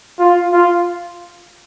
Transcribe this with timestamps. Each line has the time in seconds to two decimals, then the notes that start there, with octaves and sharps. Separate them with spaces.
0.19 F4
0.52 F4